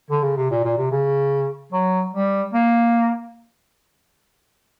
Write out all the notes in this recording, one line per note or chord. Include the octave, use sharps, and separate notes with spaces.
D3
C#3
C3
A#2
A#2
C3
C#3
F#3
G3
A#3